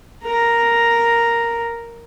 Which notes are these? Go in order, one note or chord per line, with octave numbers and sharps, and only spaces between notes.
A#4 A#5